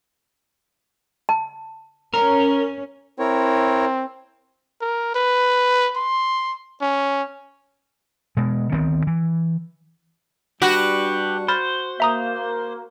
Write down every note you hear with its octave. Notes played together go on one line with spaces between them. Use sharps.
A5
C#4 A#4
C4 E4 A#4 C#5
A#4
B4
C6
C#4
B2 G#3
D2 D#3 B3 C4
E3
G3 D4 F#4 G4 B4
C5 B5 F6 A6
A#3 E5 A#5 D#6